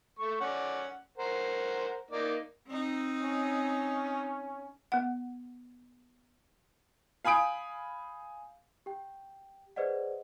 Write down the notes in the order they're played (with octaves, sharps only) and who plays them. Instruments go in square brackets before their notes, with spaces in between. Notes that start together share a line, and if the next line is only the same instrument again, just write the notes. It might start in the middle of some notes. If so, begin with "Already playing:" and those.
[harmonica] A3 C#6
C#4 D5 F#5
A#4 C5 F#5
A#3 D#4 D5
[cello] C4 D#4
[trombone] C#4
[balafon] B3 F#5
[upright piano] F5 G#5 B5 D#6 D7
[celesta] G4 G5
G#4 B4 C5 D5 D#5 F#5